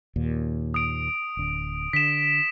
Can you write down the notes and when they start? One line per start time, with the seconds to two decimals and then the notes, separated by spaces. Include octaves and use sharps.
0.16 D#2 A#2
0.74 D#6 D7
1.37 D1 D3
1.93 D3 B6 E7